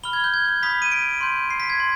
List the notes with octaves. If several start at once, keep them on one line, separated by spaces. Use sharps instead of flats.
B5 F6 G7
G#6
G6
G#6
G6
B5 D#6 G6 B6
D#7
D7
C6 G6
C7
B6
G#6
C6